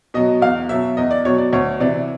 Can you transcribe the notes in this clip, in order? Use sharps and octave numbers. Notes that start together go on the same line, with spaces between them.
B2 F#3 D#5
E2 F5
B2 F#3 E5
E2 D#5
D5
B2 F#3 C#5
D5
D2 C#5
C3 E3 D5